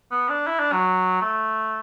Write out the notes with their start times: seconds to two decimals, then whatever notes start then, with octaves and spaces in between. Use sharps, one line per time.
0.11 B3
0.29 D4
0.47 E4
0.59 D4
0.72 F#3
1.21 A3